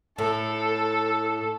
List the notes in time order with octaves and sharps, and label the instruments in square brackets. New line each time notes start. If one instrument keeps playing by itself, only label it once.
[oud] A2 [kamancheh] A4